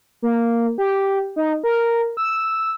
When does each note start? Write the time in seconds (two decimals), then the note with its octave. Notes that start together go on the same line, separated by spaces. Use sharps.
0.22 A#3
0.78 G4
1.36 D#4
1.64 A#4
2.17 E6